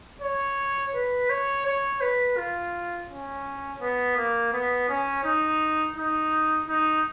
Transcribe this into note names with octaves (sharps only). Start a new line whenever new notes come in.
C#5
B4
C#5
C#5
B4
F4
C#4
B3
A#3
B3
C#4
D#4
D#4
D#4